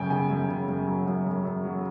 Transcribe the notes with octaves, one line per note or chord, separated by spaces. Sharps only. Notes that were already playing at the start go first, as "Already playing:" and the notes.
Already playing: F#2 C#3 F#3 G5 G#5
C#3 G#5
F#2
C#3
F#2
F#3
F#2
F#2
F#2
F#3